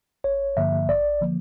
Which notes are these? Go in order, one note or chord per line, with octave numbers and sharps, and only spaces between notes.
A1 C#5
G2 D3 F3 A#3 E5
A1 D5
D3 F3 A#3